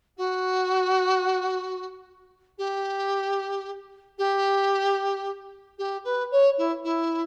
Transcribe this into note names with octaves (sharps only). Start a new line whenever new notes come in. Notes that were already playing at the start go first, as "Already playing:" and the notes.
F#4
G4
G4
G4
B4
C#5
E4
E4